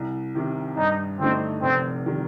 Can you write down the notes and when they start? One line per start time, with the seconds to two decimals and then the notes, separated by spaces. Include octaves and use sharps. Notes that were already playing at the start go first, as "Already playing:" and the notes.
Already playing: C2
0.35 C3 D#3
0.77 G2 D#4
1.19 D3 A3 C4 D#4
1.62 F1 C4
2.06 D#3 G3